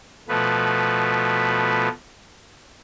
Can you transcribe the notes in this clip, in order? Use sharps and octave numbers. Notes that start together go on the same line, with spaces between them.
B2 F3 A3 B4